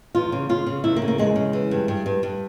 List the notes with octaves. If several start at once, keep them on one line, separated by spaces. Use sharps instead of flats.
E2 F4
C#3
C#3 F4
C#3
E2 E4
A#3
C#3
A#3
E2 G#3
C#3
E3
G2
G2
G2
G2